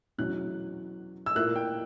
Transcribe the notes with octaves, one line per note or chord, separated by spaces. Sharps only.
E2 B2 F#3 C#4 E4 F#6
E6
A#2 A#3 E4 F#6
G5